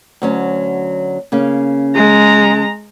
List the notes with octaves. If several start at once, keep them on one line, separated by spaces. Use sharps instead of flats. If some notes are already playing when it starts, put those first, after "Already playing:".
D2 F#3 C#4
C#3 A#3 C#4
G#3 A#5